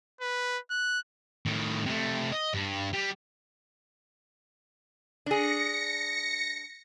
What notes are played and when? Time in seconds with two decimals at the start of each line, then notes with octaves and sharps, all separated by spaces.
0.21 B4
0.70 F#6
1.46 A2 D#3
1.86 C3 A3
2.33 D#5
2.54 G2
2.93 G3
5.26 D4 G#4 A#6 C#7